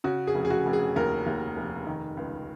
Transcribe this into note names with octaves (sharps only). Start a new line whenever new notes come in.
C#3 F#4
G#4
F1
G#4
F#4
F1
G#4
D#2 A#4
D#2
F1
D#3
C#2